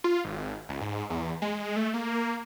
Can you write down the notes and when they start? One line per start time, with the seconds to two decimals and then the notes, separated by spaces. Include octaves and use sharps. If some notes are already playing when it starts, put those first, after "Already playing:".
0.04 F4
0.24 G#1
0.69 C#2
0.81 G#2
1.10 E2
1.42 G#3
1.76 A3
1.94 A#3